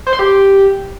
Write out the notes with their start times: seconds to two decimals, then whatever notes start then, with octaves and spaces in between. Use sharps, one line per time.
0.07 C5
0.13 C6
0.19 G4